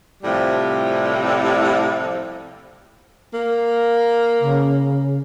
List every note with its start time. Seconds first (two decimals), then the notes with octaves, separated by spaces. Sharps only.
0.22 A2 C3 F3 G3
3.34 A#3
4.41 C#3